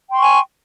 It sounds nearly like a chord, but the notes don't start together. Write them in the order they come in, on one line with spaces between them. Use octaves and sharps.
G5 C6 C#6 G#5